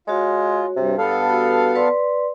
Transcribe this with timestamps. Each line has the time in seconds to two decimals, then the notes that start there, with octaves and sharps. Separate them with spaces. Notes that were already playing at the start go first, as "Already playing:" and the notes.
0.08 G#3 F4 F#4 C#5
0.76 G2 C3
0.98 G2 B3 A4 F5
1.30 F#4
1.75 B4 D5 C6